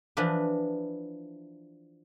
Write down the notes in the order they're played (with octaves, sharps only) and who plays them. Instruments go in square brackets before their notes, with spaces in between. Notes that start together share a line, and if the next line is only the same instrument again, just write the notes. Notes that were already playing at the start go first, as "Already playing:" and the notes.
[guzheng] E3 F3 D4 B4